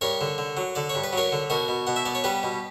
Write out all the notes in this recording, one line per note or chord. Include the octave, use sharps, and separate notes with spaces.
G2 A#4 C#5
D3
D3
F#3
D3 D5
C#5
G2
B4
F#3 A#4 C#5
D3
B2 F#4 A#4
B2
B2 F#5
E5
B3 D5
C#5
G3 G4 B4
B2